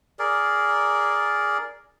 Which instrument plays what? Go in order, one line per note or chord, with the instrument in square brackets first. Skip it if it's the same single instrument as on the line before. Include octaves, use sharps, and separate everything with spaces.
[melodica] G#4 A#4 D5